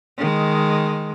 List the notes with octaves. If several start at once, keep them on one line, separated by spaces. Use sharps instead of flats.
D#3 G#3